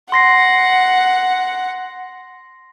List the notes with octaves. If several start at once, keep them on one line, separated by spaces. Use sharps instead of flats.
F#5 C6 A#6 C7